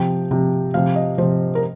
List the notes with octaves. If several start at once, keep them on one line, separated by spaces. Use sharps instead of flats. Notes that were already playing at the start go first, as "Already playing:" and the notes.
Already playing: C3 F3 G5
C3 F3
C3 F3 F5
D#5
C3 F3 C5
A#4